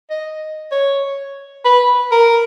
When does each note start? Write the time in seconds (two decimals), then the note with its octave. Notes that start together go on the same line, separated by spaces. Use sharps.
0.10 D#5
0.71 C#5
1.65 B4
2.11 A#4